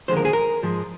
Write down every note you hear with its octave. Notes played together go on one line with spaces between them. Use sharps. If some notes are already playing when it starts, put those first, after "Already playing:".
D#2 D3 F3 G#3 C5
A#4
G#4
A#4
G#2 F3 G#3